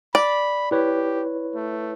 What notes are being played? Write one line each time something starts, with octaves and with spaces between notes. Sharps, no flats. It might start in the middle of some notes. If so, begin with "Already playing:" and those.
D5 B5
E4 G4 B4 C#5
A3